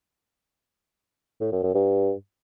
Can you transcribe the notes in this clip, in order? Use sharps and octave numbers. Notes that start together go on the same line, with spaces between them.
A2
F#2
F#2
G2